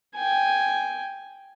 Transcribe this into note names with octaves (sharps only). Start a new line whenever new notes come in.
G5 G#5